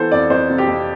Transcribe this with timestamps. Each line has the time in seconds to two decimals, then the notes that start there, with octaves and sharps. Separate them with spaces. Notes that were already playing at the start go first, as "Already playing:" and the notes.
Already playing: E3 B3 A4 C5
0.11 F2 D5
0.30 F2 C5
0.50 C3
0.58 G4
0.67 F2